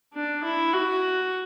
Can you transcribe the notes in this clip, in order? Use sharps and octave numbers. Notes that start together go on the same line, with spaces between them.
D4
E4
F#4